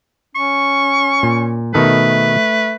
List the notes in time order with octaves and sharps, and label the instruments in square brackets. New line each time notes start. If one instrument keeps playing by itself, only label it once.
[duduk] C#4 [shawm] C#6
[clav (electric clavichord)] A#2
[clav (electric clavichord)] B2 D#3 A4 [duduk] A3 [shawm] B4